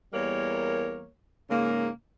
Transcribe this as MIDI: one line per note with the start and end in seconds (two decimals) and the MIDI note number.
0.13 1.08 40
0.13 1.08 55
0.13 1.08 58
0.13 1.08 70
0.13 1.08 73
1.50 1.90 44
1.50 1.90 49
1.50 1.90 58